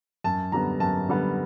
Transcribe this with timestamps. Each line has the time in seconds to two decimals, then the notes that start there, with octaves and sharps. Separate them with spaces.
0.24 F#2 A5
0.52 D3 G3 B3 A#5
0.80 F#2 A5
1.08 D3 G3 B3